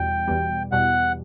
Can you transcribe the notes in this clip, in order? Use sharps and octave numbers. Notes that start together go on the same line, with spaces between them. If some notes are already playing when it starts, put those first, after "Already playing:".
Already playing: E2 B2 G3 G5
E2 B2 G3
E2 B2 G3 F#5